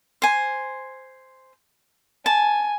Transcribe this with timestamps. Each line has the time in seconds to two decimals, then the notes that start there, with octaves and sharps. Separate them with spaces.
0.22 C5 G#5
2.26 G#5 A5